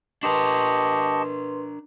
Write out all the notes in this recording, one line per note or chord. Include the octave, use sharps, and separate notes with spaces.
D4 G4 A#4 B4 D#5 A5 C6 C#6